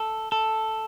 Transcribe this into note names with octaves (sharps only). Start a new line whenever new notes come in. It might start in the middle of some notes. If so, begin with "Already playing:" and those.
Already playing: A4
A4